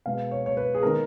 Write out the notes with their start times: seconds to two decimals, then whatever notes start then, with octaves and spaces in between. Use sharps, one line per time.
0.06 B2 G#3 B3 F5
0.31 C#5
0.46 C#5
0.57 B4
0.75 G#4
0.83 D#3 G#3 B3 A#4